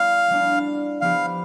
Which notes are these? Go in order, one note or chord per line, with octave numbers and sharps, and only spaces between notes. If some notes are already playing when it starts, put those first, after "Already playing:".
Already playing: G3 B3 E4 F5
G3 B3 D4
F3 B3 E4 G4 B4 F5